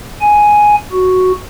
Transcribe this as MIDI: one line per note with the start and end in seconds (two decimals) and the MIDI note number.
0.21 0.75 80
0.92 1.32 66